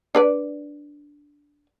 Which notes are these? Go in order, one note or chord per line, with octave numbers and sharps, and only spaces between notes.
D4 B4 D5